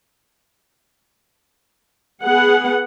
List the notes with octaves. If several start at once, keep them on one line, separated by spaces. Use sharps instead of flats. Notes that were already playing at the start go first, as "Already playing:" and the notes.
B3 G#4 F#5